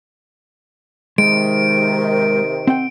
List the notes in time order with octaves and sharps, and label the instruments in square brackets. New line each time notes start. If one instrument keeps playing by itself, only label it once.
[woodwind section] C3 D#3 [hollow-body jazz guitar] G#3 [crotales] D7
[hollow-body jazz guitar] C4 F#5 G5